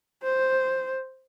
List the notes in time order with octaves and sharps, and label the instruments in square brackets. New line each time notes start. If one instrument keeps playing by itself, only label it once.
[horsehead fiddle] C5